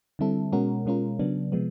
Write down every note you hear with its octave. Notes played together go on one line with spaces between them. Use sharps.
D3 G3 C4 E4 A4
B2 G#3 C#4 F#4 A#4
B2 G#3 C#4 F4 A#4
C#3 F#3 B3 D4
C3 F3 G#3 B3